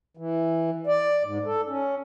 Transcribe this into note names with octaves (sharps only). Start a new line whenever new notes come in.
E3
D5
G#2
A4
C#4